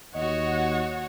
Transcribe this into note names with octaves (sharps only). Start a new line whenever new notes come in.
D#2 F#4 C#5 D#5 F#5